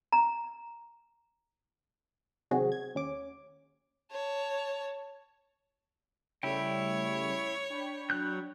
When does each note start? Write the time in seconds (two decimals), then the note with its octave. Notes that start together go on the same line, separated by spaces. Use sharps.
0.13 A#5
2.51 C3 D#3 F#3 C4 F#4 G#4
2.72 G#6
2.95 D#2 C#4 D6
4.12 C#5 A5
6.43 C#3 G3 A3 E4 C#5 G5
7.70 D4 G5 B5
8.10 F#3 F#6 G6